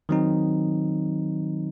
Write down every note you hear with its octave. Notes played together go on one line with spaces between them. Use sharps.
D#3 F#3 C4 D#4